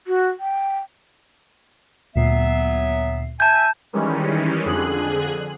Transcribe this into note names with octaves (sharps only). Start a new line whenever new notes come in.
F#4
G5
D2 A#2 F#3 B3 E5 C7
E5 G#5 A5 G6
D#3 E3 G3 G#3 C#4
F2 D3 G#4 F#6